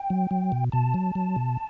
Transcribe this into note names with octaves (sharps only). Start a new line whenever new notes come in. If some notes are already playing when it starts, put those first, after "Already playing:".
Already playing: G5
F#3
F#3
B2
B2 A5
F#3
F#3
B2